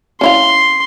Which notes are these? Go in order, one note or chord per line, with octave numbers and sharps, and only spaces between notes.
C#4 E4 F5 C6